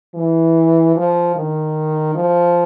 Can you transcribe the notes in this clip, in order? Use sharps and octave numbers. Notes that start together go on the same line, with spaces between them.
E3
F3
D#3
F3